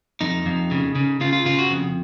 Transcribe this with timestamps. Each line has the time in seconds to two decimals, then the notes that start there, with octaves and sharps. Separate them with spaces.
0.21 F2 D#4
0.46 F2
0.71 C#3
0.95 C#3
1.21 C#3 F4
1.33 F4
1.45 C#3 F4
1.59 F#4
1.71 F2